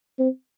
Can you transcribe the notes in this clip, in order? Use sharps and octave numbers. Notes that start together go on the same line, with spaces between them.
C4